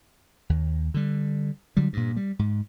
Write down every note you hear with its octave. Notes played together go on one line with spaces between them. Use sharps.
D#2
D3 G3
D3 F#3 G3
G2 A#2
G3
G#2